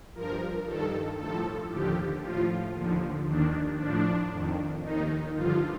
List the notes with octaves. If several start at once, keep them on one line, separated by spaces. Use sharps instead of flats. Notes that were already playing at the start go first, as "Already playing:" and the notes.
G2 F3 A#4
G2 D#3 A4
A2 F3 A4
D#2 D3 F3 G4
A2 F3 F4
D#2 D3 F3
D#2 D#3 D4
A2 F3 D4
F2 D#3
D#2 D#3 D#4
G2 D3 F3 F4